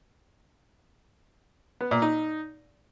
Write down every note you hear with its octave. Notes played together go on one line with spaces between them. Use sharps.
B3
A#2
D#4